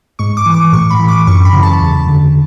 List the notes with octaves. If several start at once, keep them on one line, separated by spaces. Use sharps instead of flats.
G#2 C#6
D6
E3
D6
A2 C#6
B5
E3
D6
F#2 C#6
B5
C#3 E3
A5
E2
D3